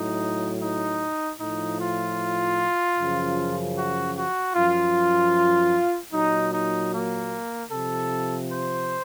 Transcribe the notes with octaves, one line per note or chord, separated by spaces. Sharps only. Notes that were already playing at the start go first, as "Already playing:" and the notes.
Already playing: A2 F#3 D#4
D#4
A2 F3 D#4
F4
F#2 C#3 F3
F#4
F#4
F#2 F3 F4
A#2 F#3 D#4
D#4
A#3
C3 F3 A4
C5